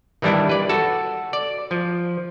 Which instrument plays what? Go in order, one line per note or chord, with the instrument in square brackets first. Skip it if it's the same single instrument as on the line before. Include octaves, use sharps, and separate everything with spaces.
[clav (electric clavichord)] D#3 E3 G3 D4 E4
B4 D5
F#4 A4 A5
D5
F3